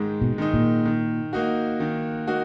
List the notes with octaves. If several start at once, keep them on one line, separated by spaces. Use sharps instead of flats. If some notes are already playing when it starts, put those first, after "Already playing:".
Already playing: G#2 D#3 G#3 D#4
B2
D#3 G#3 D#4
A#2
D#3
A#3 D#4 F#4
D#3
A#3 D#4 F#4